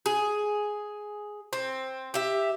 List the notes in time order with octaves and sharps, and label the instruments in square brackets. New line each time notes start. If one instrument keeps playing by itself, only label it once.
[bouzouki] G#4
C4
G4 E5